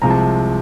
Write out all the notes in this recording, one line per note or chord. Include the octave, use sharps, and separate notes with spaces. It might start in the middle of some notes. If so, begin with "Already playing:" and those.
C2 C3 F3 G#3 A#5
A5